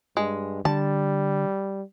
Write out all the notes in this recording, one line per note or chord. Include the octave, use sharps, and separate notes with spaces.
G2 G#3
D3 G3 A5